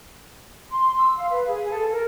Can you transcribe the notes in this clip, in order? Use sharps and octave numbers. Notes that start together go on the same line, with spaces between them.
C6
E6
F5
B4
G#4
A4
A#4